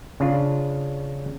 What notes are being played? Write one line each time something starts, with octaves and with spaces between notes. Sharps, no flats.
C#3 D4 F4